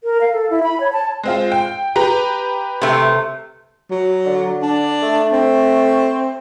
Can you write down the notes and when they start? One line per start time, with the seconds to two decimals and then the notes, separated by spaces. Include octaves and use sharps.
0.04 A#4
0.21 F5
0.33 A4
0.50 E4
0.63 B5
0.80 C#5
0.93 A5
1.23 G#3 C4 F4
1.52 G5
1.96 G4 B4 A#5
2.82 C3 A3
3.91 F#3
4.26 D3
4.62 D4
5.03 A3
5.32 C4